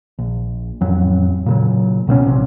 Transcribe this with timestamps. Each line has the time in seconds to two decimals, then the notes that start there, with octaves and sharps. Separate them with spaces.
0.19 A#1
0.81 A1 F2 F#3
1.46 A#2 C#3 F#3
2.07 C#2 B2 C4 C#4
2.23 A#1 C3